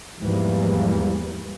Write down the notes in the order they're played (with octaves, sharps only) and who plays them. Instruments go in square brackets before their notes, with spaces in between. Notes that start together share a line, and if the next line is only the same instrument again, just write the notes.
[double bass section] E2 G#2 E3 F3 G3 A#3